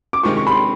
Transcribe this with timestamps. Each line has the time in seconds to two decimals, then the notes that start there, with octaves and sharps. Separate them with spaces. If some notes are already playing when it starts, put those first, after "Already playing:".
0.13 D6
0.23 C3 D#3 G#3 C4 F4 C#6
0.37 C#6
0.47 B5
0.50 C6